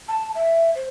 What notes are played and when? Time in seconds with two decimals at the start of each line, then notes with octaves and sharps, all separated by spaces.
0.08 A5
0.35 E5
0.75 C5